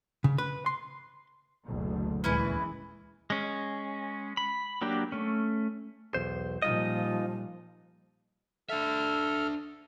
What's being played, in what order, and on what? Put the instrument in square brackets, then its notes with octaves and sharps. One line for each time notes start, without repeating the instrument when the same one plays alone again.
[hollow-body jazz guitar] C#3
B4
C6
[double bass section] F#1 D2 B2
[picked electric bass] D#1 D2 A#2 [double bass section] E3 G#3 [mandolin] C#4 E4 B4
[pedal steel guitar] G#3 C#4
B5
F#3 A#3 D4 G4
A3 C#4
[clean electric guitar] B1 E2 C5
[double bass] A#2 G3 [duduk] F3 [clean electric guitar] D#4 F4 D#5
[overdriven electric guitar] D4 E5 [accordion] A4 F6